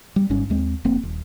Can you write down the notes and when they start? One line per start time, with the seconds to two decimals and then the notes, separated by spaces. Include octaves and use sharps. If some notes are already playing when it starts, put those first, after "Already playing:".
0.16 G3
0.30 G1 G#2 G3 C#4
0.50 D#2 G#3 C4
0.85 F1 A#3 C4
1.03 D#1